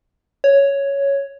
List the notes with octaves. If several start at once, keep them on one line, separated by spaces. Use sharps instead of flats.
C#5